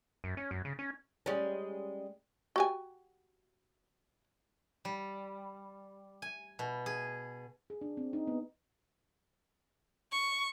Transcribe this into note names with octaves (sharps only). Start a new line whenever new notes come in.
F#2
C#4
F#2
C#3
C#4
G3 G#3 C#4
F#4 G4 G#5
G3
G#5
B2
G#4
G#4
D4
C4
D#4
B3
C#6